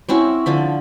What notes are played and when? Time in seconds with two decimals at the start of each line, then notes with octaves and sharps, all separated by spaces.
0.09 C4 C#4 E4 F#4
0.46 D3 F3 B5